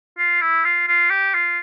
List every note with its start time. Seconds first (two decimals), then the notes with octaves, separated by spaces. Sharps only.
0.18 F4
0.41 E4
0.65 F4
0.88 F4
1.10 G4
1.34 F4